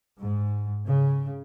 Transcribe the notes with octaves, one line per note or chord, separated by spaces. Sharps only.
G#2
C#3